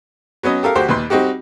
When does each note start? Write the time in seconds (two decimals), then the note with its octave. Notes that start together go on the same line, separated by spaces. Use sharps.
0.43 F#3 B3 C#4 D#5
0.63 G4 A4 A#4 F5
0.75 D2 F#4 G4 C5
0.88 D#2 A#2 B4 C6
1.10 G3 C4 D#4 F#4 G4